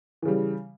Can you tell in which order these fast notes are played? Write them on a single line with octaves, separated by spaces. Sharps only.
E3 C#3 G3